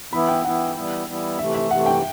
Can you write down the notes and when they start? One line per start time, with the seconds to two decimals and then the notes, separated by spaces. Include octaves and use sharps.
0.13 E3 B3 E4 B5
0.29 G5
0.44 E3 B3 E4 F#5
0.76 E3 G3 B3 E4
1.07 E3 G3 B3 E4
1.39 C3 E3 A3 E5
1.54 E5
1.71 C3 E3 A3 F#5
1.86 G5